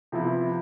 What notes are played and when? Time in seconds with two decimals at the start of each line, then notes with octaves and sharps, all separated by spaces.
0.12 C3 F3 B3 E4